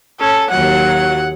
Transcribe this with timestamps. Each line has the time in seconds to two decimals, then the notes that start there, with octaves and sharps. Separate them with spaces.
0.20 C#4 A4
0.50 D#2 F#3 F#5